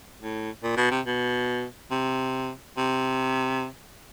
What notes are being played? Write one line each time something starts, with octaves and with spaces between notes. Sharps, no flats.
A2
A#2
B2
C3
B2
C3
C3